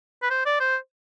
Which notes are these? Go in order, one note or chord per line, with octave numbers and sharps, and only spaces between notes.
B4
C5
D5
C5